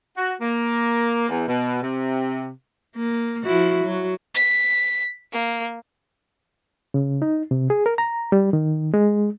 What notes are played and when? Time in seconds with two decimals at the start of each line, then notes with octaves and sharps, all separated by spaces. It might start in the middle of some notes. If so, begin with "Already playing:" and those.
0.17 F#4
0.40 A#3
1.29 E2
1.47 B2
1.83 C3
2.95 A#3
3.44 F3 E4 F#4
3.84 F#3
4.35 B6
5.32 A#3
6.94 C#3
7.22 D#4
7.51 C3
7.70 G#4
7.86 A#4
7.98 A#5
8.32 G3
8.53 D#3
8.94 G#3